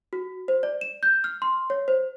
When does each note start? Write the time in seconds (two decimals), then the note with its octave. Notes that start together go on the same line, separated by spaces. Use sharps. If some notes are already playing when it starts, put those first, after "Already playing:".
0.13 F#4
0.48 C5
0.63 D5
0.81 E7
1.03 G6
1.24 F6
1.42 C6
1.70 C#5
1.88 C5